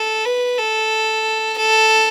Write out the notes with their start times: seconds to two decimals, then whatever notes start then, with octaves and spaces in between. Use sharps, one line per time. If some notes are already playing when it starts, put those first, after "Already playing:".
Already playing: A4
0.25 B4
0.58 A4
1.58 A4